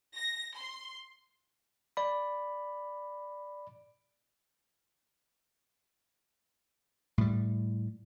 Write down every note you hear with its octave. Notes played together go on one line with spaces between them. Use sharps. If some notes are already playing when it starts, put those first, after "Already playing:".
A#6
C6
D5 B5
A2 G3